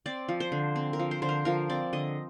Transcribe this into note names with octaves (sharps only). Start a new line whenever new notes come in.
C4 D5
F3
C5
D3
C4
A#4
F3
C5
D3 C5
A#4
F3 A#4
C4 D5
D3 D#5